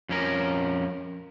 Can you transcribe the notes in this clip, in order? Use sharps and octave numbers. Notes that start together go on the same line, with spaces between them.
F2 C#4 A#4